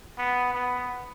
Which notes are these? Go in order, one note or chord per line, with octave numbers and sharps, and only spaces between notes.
B3
B3